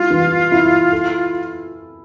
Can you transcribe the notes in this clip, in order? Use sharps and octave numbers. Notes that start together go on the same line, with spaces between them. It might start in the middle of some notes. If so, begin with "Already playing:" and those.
Already playing: G3 E4 F4
E3
E4
A4